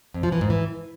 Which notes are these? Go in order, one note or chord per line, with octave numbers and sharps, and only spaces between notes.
F2
F3
E3
G#2
E3